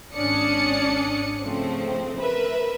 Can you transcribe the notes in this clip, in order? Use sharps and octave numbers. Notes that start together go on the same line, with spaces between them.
G#1 C#4 D4 D5 D#6 C#7
C#3 F3 A3 C4
A#4 B4 E5